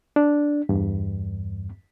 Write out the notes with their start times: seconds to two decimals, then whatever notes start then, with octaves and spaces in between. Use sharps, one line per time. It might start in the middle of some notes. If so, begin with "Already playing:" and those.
0.16 D4
0.69 E2 G2